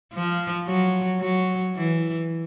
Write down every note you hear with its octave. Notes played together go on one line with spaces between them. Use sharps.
F3
F#3
F#3
E3